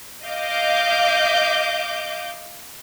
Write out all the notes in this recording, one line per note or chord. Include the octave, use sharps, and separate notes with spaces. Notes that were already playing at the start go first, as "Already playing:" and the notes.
D#5 F5 D6 G6